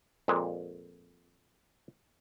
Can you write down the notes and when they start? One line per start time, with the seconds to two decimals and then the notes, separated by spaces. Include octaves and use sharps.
0.28 F2 A#2 G#3